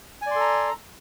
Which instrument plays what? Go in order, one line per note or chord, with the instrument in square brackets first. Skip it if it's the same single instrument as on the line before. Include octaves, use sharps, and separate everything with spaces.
[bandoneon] G#5
D5
C6
A4
A#5